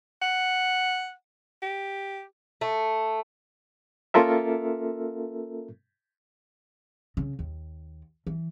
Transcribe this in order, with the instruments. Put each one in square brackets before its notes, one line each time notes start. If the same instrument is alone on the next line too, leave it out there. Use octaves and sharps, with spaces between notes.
[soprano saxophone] F#5
G4
[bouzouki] A3
[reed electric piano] A#3 C#4 F4 A4 A#4 E5
[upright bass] C#3
D#2
E3